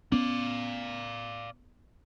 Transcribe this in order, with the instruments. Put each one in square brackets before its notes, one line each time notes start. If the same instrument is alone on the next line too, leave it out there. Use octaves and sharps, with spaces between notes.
[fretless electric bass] B3 C#4 [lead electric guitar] D5 F5